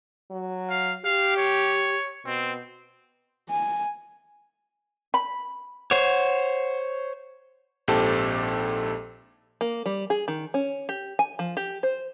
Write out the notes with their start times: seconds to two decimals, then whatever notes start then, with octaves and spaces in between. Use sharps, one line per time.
0.31 F#3
0.70 F5
1.05 G4 F5
1.37 C#5
2.26 B2 C4
3.50 G#5
5.14 B5
5.91 C5 C#5 F#5
7.88 A#1 G#2 C4 G4 A4 A5
9.61 A#3
9.86 G3
10.10 G#4
10.28 D#3
10.54 C#4
10.89 G4
11.19 G#5
11.39 F3
11.57 G4
11.83 C5